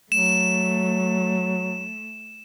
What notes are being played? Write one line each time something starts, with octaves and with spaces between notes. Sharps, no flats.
F#3 A3 E7